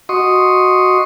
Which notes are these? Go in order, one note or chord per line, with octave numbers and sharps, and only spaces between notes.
F#4 D#5 C6 C#6 D#6